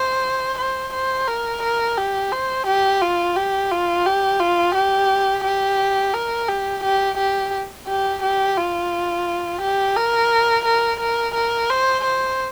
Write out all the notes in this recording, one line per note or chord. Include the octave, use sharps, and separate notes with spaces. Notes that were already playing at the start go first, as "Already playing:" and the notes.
Already playing: C5
C5
C5
A#4
A#4
G4
C5
G4
F4
G4
F4
G4
F4
G4
G4
A#4
G4
G4
G4
G4
G4
F4
G4
A#4
A#4
A#4
A#4
C5
C5